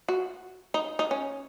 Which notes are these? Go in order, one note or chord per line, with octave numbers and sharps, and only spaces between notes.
F#4
D#4
D#4
C#4